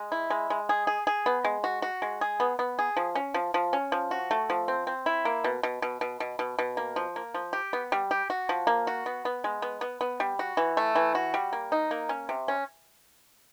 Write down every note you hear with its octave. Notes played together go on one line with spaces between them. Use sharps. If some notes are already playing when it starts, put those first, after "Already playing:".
Already playing: G#3
E4
G#3
G#3
G#4
G#4
G#4
B3
G#3
F#4
F#4
G#3
G#4
B3
B3
G#4
F3
C#4
F3
F3
C#4
F3
F#4
A3
F3
C4
C4
E4
A#3
B2
B2
B2
B2
B2
B2
B2
A#3
F3
A#3
F3
G4
B3
G3
G4
F#4
F3
A#3
F#4
B3
B3
G#3
B3
B3
B3
G3
F#4
E3
A3
E3
F#4
G3
A#3
D#4
A#3
C#4
C3
C#4